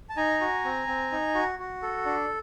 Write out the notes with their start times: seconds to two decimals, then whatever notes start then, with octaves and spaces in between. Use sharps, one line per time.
0.09 A5
0.17 D#4 G#5 A#5
0.41 F#4
0.64 C4
0.87 C4
1.12 D#4
1.35 F#4
1.59 F#4
1.82 A4
2.06 D4